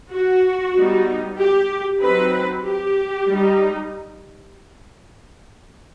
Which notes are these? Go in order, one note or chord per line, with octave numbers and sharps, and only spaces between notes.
F#4
G3 B3 D#4
G4
F#3 C4 D#4 B4
G4
G3 D#4